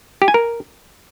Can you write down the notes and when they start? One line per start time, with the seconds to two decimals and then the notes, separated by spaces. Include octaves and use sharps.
0.22 G4
0.28 G#5
0.34 A#4